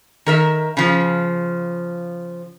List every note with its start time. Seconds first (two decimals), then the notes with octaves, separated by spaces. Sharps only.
0.26 D#3 A#4 E5
0.77 C#3 F3